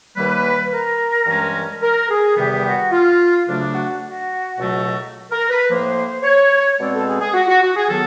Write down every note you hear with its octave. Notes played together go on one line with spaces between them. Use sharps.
D#2 D#3 G3 A#3 B4
A#4
G2 E3 G#3 C#4
A#4
G#4
E2 C3 D#3 G3 B3 G4
F#4
F4
D2 C#3 F#3 A3 D4
F#4
F#4
C#2 B2 F#3 A3
A#4
B4
A2 F3 A#3 C5
C#5
B2 G#3 C4 D5
A4
G#4
G#4
F#4
F#4
F#4
G#4
D#3 F#3 B3 A4